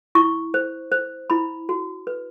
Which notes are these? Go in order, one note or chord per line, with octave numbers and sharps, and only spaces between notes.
E4 C#6
C5
C5
E4 B5
F#4
B4